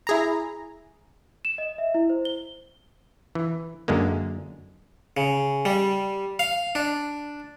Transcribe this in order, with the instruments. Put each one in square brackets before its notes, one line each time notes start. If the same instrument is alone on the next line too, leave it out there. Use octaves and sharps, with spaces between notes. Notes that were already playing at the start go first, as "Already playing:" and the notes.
[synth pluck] E4 G#4 A#5
[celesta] E7
D#5
E5
E4
C5
G7
[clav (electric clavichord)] E3
F#2 D3 G#3 A#3
[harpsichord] C#3
G3
F5
D4